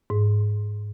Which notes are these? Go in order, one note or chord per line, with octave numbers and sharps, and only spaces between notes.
G#2